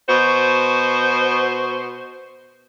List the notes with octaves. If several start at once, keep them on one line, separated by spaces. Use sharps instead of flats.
B2 F#4 C5